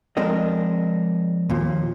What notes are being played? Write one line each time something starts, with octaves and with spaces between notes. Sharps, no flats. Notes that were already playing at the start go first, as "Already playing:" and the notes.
F3 G#3 C4 D4 A#4 D#5
D#2 A#2 F3